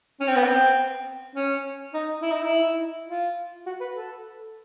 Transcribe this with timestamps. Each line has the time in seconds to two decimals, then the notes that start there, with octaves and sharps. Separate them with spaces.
0.21 C#4
0.28 C4
0.36 B3
0.44 C4
1.36 C#4
1.94 D#4
2.22 E4
2.32 D#4
2.42 E4
3.09 F4
3.66 F#4
3.81 B4
3.95 A4